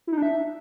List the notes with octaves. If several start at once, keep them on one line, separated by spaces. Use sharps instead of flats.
E4
D#4
D4
E5